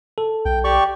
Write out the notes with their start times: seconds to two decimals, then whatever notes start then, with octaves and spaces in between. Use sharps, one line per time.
0.18 A4
0.45 B1 G5
0.64 G4 D5 C#6